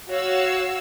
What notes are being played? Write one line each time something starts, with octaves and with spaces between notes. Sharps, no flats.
F#4 C#5 F5 E6